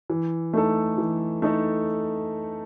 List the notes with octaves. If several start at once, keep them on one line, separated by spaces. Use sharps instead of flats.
E3
A3 D#4 A4
E3
A3 D#4 A4